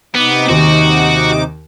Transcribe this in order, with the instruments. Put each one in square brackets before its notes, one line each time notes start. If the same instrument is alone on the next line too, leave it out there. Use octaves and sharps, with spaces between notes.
[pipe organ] C3 D#4 D6 [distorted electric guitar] B3
[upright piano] D#2 [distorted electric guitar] F#4